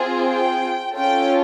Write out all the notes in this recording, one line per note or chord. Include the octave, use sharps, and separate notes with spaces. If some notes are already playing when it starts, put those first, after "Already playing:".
Already playing: C4 F4 G#4
G5
C#4 F4 A4 G5